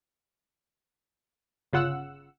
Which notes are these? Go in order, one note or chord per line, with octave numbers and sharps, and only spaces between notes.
G1 C#3 F4 F#5 E6